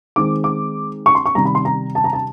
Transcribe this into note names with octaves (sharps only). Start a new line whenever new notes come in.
D#3 G#3 C4 D6
D6
C#6
C6
C#6
C3 D#3 G3 A#5
B5
C6
A#5
A5
A#5
A5